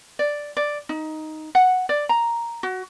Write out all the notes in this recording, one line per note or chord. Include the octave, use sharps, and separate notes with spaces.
D5
D5
D#4
F#5
D5
A#5
F#4